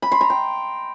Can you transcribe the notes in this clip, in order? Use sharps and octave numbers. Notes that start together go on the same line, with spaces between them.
B5
C6
A#5
G5